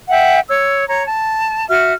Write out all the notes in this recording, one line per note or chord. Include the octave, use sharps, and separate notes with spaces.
E5 F#5 G5
C#5 E6
C#5 A#5
A5
F#4 E5 F6